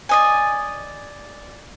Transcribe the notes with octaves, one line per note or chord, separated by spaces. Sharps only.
D5 D#5 G#5